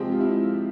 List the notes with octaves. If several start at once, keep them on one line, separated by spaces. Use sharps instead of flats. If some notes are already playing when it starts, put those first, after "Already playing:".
Already playing: C3 F3 G#3 C4 G4
F4
E4